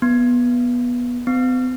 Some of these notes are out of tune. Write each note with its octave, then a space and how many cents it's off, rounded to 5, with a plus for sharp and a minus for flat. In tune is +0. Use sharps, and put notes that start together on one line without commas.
B3 -15
B3 +45